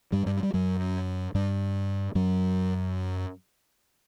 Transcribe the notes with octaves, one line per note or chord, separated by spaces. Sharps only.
G2 G3
G2 G3
G3
F#2 F#3
G2 G3
F#2 F#3